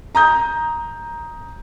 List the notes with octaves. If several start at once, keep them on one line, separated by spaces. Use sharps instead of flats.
A#5 D#6 G6